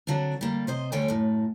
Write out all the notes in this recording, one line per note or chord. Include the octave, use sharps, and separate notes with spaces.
D3 F#3 C4 D4
G3 A#3
C3 C5 D#5
D2 D3 G3 C#5 G5 G#5
F#2 A2